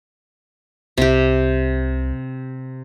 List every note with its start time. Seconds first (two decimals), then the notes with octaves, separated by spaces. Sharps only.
0.98 C2 C3 G4